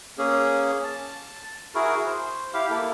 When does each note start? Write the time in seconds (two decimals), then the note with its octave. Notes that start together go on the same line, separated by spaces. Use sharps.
0.18 A#3 C#4 G#4
0.84 A5
1.75 E4 F#4 G#4 A#4
2.06 C5
2.54 E4 G4 F5
2.70 A#3 E4 A4